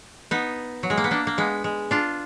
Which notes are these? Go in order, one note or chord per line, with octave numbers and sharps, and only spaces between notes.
B3 D#4
F#3
G#3
A#3
B3
A#3 D4
A#3
G#3 B3
G#3
D4 F4